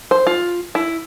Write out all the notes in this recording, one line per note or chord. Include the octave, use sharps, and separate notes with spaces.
C5
F4
E4